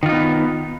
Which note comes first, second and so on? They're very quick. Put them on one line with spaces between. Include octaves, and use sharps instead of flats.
D#3 F4 D#4 B3